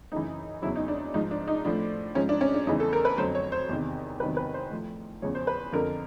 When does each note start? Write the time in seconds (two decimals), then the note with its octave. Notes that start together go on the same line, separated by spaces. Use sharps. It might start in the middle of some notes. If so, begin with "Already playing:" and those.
0.12 F#2 C#3 E3 D#4
0.62 E2 C#3 F#3 E4
0.76 D#4
0.88 D4
1.14 G#2 F3 D#4
1.31 D4
1.48 D#4
1.65 A2 F3 D4
2.15 G#2 F3 C#4
2.29 D4
2.41 C#4
2.54 D4
2.67 E2 C#3 E3 D#4
2.80 A4
2.93 A#4
3.05 B4
3.17 F2 D3 F#3 C5
3.35 C#5
3.52 C5
3.69 E2 C3 D#3
4.20 E2 C3 D#3 F#3 B4
4.37 B4
4.54 C5
4.70 A2 F3
5.22 E2 C#3 F3 C#5
5.35 C5
5.47 B4
5.72 F2 D3 F3 A#4